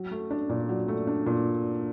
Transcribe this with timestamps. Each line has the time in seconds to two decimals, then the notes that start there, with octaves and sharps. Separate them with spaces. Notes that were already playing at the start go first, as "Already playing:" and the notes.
Already playing: F#3
0.11 A3
0.31 D4
0.49 A#2
0.69 F#3
0.88 A3
1.07 D4
1.26 A#2